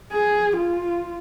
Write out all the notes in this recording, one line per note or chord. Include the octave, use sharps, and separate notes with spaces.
G#4
F4